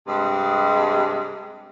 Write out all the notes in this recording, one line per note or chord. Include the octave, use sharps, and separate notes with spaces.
G2 C3 G#3